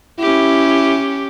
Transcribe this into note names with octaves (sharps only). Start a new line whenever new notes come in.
C#4 E4 G4